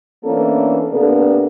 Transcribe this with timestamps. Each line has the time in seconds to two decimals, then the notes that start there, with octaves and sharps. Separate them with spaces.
0.22 E3 A#3 B3 C#4 D4 A4
0.90 C3 A#3 B3 D4 A4 A#4